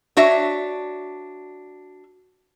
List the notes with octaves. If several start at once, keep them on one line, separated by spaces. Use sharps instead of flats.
D4 F#4 C#5 E5